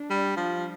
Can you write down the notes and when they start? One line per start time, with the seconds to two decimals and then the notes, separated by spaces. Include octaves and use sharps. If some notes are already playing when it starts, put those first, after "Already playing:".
Already playing: D4
0.10 G3
0.37 F3